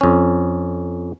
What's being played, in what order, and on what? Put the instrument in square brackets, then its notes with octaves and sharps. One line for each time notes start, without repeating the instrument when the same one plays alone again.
[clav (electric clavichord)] F2 C#4